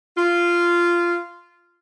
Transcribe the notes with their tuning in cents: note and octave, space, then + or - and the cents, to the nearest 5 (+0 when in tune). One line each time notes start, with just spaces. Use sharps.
F4 -10